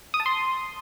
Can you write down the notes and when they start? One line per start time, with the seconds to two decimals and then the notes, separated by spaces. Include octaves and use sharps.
0.14 D#6
0.20 A5
0.26 C6